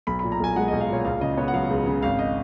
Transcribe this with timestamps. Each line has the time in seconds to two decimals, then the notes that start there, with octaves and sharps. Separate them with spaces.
0.07 B1 B5
0.19 A#2 B5
0.32 A#5
0.40 B1 G#5
0.56 G#3 F#5
0.68 B1 D#5
0.81 F5
0.88 A#2 C#5
1.05 C#2 F5
1.21 C#3 D#5
1.37 B3 C#5
1.48 F#5
1.54 F#3 F5
1.70 C#2
1.86 C#3
2.03 G#1 F5
2.19 D#5